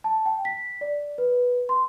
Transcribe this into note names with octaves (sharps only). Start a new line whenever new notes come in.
A5
G5
B6
D5
B4
C6